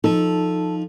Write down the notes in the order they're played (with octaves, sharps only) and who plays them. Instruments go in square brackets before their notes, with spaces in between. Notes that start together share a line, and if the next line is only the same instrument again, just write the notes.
[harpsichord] F3 [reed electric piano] D#4 [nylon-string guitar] A4